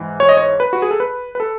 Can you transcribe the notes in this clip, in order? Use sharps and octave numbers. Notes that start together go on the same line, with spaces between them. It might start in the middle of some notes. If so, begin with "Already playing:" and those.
Already playing: G#2 E3
C#5
D#5
C#5
B4
F#4
G#4
A4
B4
B4
A4